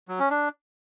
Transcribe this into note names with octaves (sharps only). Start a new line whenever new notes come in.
F#3
C#4
D4